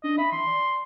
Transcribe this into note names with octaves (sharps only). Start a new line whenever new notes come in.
D4 D#5
E5 B5
E3 C6
D5